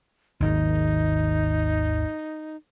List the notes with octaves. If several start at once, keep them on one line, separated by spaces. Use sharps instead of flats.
G#1 D#2 D#4